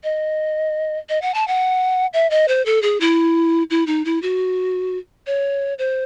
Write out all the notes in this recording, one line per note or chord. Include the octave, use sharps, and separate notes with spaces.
D#5
D#5
F#5
A5
F#5
E5
D#5
C5
A4
G#4
E4
E4
D#4
E4
F#4
C#5
C5